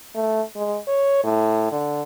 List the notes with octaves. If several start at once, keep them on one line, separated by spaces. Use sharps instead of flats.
A3
G#3
C#5
A2
D3